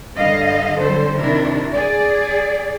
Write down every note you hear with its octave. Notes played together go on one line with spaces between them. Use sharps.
G2 D3 D#5 F5
D3 F#3 G3 C4 A4 C5
C3 D#3 D4 E4 A#4
G#4 D5